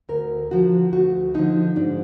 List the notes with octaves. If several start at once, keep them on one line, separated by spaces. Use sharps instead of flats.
D2 A#4
D3 F3 F#4
D2 F#4
D3 F3 D#4
G#2 D4